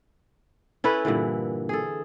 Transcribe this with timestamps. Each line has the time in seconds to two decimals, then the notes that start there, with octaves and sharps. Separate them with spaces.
0.84 C#4 E4 A4 B4
1.05 G2 A#2 D3 E3
1.69 G#4 A4